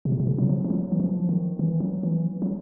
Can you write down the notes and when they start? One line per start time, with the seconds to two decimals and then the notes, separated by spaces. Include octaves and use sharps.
0.05 C3
0.12 B2
0.20 C3
0.27 C#3
0.38 F#3
0.49 F3
0.64 F3
0.70 F#3
0.92 E3
1.00 F3
1.29 D#3
1.59 E3
1.80 F#3
2.03 E3
2.42 F#3